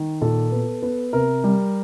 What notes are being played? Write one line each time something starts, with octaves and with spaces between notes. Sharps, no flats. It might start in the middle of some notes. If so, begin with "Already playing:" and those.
Already playing: D#3
A#2 A4
B3
B3
C3 A#4
G3